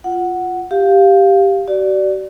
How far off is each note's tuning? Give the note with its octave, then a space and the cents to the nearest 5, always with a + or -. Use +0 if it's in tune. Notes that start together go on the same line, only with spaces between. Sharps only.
F4 +0 F#5 +0
G4 +0 F5 +0
F#4 +45 D5 +0